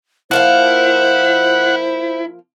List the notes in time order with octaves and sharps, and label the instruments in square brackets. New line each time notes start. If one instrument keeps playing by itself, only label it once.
[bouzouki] F3 A#3 F5 [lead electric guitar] E4 [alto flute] C5 [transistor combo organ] F#5